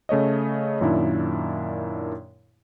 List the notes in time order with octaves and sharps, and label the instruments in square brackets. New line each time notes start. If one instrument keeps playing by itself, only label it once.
[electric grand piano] C#3 A3 C#5 D#5
F#2 A#2 D#3 D4 E4